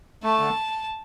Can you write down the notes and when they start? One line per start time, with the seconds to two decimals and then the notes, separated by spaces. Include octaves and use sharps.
0.23 A3 A5
0.39 D3